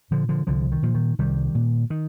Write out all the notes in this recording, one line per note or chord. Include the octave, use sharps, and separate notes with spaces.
A#2 D3 F3
D3 F3
C2 D3 F3
D#3
A#2 F3
D#3
C2 D#3 G3
A#2
D#3